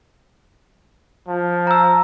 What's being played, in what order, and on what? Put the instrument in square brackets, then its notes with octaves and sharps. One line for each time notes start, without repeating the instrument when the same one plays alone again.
[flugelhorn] F3
[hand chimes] A#5 E6